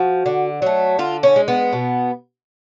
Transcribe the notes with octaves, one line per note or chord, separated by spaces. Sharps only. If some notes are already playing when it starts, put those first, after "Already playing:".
Already playing: F3 F#4
D3
F#3 A3
D3 F4
C#4
G#3
B3
B2